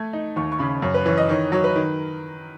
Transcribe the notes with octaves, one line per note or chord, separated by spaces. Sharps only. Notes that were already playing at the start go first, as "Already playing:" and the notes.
Already playing: A3 G#6
D#4
D#2 C#6
C#6
C#3 B5
F#2 C#5
B4
E3 C#5
D#5
D#3 C#5
F#3 C#5
B4
D#3